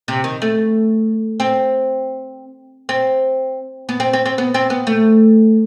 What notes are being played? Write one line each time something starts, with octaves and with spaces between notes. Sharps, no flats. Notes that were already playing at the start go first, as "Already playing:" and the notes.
C3
D#3
A3
C4
C4
B3
C4
C4
C4
B3
C4
B3
A3